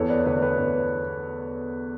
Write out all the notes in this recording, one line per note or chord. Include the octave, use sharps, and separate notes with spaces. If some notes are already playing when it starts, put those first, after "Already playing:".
Already playing: E2 A4 C#5
B4 D5
D3 A3 B4 D5
B4 D5
E2